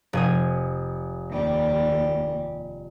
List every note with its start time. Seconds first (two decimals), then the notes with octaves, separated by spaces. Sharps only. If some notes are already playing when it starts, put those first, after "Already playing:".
0.13 F1 G#5 D#6
1.30 D#2 G3